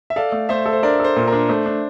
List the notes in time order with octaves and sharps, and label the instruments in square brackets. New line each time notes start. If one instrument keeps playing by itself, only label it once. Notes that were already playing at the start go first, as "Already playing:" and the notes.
[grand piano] E5
[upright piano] A4 [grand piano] D5 F5
[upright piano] A3
[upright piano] A3 [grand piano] C5 E5
[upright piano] A4
[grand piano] C5
[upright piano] D4 [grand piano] A#4 D5
[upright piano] A4 [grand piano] C5
[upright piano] A#2
[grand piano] A#4
[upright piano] D4
[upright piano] A3 [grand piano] C5
[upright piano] D4